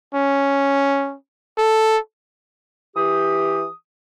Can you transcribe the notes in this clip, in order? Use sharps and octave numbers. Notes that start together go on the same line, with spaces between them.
C#4
A4
E3 G4 D#6